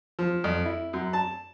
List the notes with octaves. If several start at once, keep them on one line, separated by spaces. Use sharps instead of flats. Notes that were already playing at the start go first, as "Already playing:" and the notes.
F3
F2
E4
F#2
A5